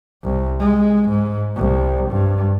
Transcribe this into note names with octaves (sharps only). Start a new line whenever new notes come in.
C2
G#3
G#2
C2
G2